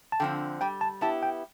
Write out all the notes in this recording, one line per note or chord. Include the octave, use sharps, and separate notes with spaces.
A5
D3 F3 C4 G5
G3 G5
A5
B3 E4 G4 A5
G5